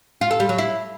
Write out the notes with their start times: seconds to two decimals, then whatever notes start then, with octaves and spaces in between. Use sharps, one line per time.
0.21 F4
0.31 A4
0.40 G3
0.49 F#3
0.58 E4